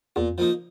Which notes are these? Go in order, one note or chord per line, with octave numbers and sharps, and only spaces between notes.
E2 A#2
F2
F3 A#3 D#4